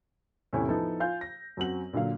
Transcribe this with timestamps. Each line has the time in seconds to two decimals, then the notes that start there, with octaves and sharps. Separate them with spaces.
0.53 E2 A2 C3 A3 C#4 E4
0.68 F3 B3 D#4 E4 A4
1.00 F4 F5 G#5 G6
1.21 A#6
1.57 F#2 C4 F#4 F#7
1.93 A#2 D3 F#3 F5